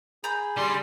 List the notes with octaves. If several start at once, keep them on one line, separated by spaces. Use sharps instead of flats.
G#4 A#5 B5 G6
D3 G3 C6